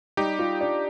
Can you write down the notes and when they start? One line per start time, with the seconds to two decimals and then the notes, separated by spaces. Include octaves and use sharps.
0.17 G3 D#4 G4
0.39 F4
0.61 D4